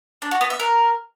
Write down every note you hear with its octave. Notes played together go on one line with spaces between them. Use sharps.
D4
F#4
B3
E5
A#4